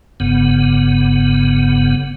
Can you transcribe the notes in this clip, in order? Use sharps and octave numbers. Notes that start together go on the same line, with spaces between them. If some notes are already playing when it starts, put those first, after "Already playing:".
F#1 G2 C#3 B3